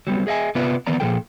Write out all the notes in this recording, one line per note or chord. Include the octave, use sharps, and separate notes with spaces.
F#3 G3 B3 C4
G#4 D#5 E5 G#5
C3 B3 F4 B4 D5 E5
D#3 E3 B3 D5 A#5
A#2 D#3 F3 G#4 A4 G5